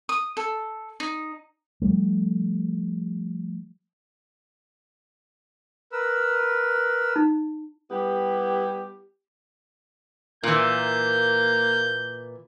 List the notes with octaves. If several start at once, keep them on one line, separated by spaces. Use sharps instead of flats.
D#6
A4
D#4
F3 G3 A3
A#4 B4 E6
D#4
G3 B3 E4 G4
A#2 E3 A#3 G6